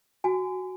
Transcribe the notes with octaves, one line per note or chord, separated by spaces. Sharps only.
F#4 G#5